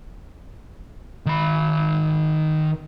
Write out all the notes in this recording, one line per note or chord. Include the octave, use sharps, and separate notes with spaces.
D#3 B5